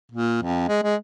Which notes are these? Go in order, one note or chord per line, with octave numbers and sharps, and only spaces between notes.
A#2
F2
G#3
G#3